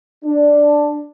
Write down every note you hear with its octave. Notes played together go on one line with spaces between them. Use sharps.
D4